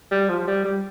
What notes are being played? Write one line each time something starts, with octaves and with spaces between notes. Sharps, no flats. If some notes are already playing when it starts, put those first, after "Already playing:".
G3
F3
F3
G3
G3